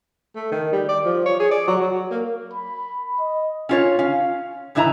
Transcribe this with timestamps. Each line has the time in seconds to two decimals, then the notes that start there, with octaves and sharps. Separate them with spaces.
0.36 A3
0.52 D#3
0.72 G3
0.89 D5
1.05 F3
1.26 C#5
1.40 G#4
1.51 D5
1.68 F#3
1.81 F#3
2.11 A#3
2.53 B5
3.19 D#5
3.69 C#4 F4 C#5
3.99 C#4 F5
4.75 A2 E3 D#4 E4 G#5 A#5